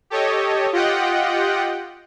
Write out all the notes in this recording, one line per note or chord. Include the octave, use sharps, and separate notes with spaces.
G4 A4 C#5 D#5
F4 G4 D#5 F#5 G5